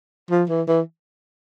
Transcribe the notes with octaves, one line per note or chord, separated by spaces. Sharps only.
F3
E3
E3